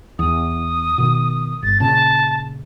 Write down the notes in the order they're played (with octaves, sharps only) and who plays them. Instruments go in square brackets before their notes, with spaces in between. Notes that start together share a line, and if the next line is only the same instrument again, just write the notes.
[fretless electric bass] E2 [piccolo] D#6
[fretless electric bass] B2 D#3
[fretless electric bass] G1 [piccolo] A6
[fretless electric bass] A#2 C#3 [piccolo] A5